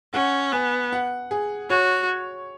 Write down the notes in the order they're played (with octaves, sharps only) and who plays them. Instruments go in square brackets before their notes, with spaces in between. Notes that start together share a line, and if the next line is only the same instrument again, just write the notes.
[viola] C#4 [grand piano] F#5
[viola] B3 [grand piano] G#5
[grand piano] F#5
G#4
[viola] F#4 [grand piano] C#5